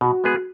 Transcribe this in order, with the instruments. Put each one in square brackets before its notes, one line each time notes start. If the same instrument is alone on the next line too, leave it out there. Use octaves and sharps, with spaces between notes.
[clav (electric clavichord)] B2 [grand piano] F#4
[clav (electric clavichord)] G#3 B3 G#4